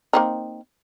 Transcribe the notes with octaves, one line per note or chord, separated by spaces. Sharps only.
A#3 C4 D#4